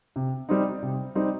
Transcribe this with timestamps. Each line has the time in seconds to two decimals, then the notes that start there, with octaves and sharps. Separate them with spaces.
0.16 C3
0.49 G3 C4 D#4
0.82 C3
1.15 G3 C4 D#4